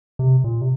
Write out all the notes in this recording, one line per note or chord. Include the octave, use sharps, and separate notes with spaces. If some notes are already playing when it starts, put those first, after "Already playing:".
C3
A#2
C3